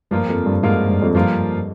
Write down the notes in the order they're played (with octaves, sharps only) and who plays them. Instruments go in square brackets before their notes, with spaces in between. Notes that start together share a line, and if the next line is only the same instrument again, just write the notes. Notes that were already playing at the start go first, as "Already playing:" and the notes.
[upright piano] G2 [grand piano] F3 A#3 F4 A#4
[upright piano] F2
G2
[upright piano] G#2 [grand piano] F3 A#3 F4 A#4
[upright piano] G2
F2
[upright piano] G2 [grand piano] F3 A#3 F4 A#4